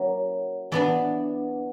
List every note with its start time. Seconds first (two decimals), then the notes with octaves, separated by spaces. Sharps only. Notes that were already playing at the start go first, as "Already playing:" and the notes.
Already playing: F#3 A#3 C#4 E4
0.72 E3 B3 D4 D5